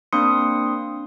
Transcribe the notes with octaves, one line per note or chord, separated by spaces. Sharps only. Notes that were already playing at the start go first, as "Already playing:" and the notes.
A#3 C4 D4 C6 D#6 C#7